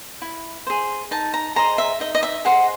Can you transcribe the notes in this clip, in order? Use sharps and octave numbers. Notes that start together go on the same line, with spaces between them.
E4
G#4 C5
D#4 A5
A#5
G#4 C5 D#5 A#5
E5
D#4 D#5
D#5
E5
G#4 C5 D#5 F#5